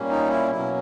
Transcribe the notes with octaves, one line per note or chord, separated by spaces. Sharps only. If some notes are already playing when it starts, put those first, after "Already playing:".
Already playing: A#2 G3 A#3 C#4
D#4
E4
B2 F#3 A#3 C#4 E4